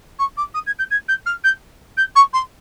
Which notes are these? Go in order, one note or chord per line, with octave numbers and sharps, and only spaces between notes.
C#6
D6
D#6
G#6
G6
G#6
G6
F6
G6
G6
C#6
C6